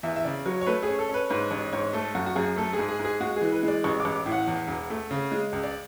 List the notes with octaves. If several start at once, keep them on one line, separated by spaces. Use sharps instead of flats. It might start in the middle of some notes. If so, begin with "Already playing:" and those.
E2 E5
E5
C#3 D5
F#3 C#5
C#5
A3 B4
G#4
C#4
A4
C#4 B4
G#2 B4
A1 C#5
G#2 C#5
A3 A4
F#2 F#4
F#4
F#2 G#4
A3 A4
G#4
G#2
G#4
G#2 G#4
G#3 F#4
E3 G#4
B4
G#3
D5
A1 C#6
D6
A1
D6
A2
F#5
E2
E1
A3
C#3
G#3
C#2
D5